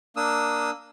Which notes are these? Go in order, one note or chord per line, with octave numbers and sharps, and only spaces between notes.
A#3 D4 D#6 E6